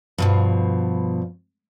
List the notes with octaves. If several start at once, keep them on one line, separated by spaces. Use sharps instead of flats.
G2 B2 F3